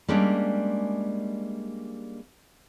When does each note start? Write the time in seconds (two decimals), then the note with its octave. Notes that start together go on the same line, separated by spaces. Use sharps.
0.08 G3 G#3 A#3 C#4 D4